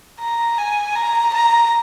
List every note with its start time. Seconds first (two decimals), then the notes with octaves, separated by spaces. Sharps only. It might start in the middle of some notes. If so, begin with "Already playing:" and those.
0.21 A#5
0.58 G#5
0.96 A#5
1.34 A#5